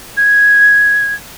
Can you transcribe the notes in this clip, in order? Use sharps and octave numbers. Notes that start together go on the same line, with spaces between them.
G#6